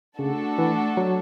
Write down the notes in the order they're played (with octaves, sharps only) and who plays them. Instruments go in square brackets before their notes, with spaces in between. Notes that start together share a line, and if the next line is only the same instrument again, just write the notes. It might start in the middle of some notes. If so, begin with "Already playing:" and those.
[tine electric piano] C#3 [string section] A3 D4 F#4 A4
[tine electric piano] E3
F#3